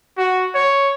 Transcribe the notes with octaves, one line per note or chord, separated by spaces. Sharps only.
F#4
C#5